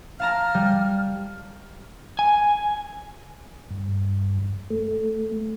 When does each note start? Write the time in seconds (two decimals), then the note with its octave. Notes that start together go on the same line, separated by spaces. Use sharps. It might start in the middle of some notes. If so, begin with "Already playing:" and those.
0.20 F5 A5 A#5 F6
0.54 G3
2.19 G#5
3.70 G2
4.70 A3